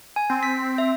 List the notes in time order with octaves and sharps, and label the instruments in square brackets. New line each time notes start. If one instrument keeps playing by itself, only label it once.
[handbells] G#5
[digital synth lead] C4
[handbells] B6
E5